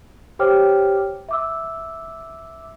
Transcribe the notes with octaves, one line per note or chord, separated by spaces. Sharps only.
G4 C5 C#5 G5 D6 F6
E5 D6 E6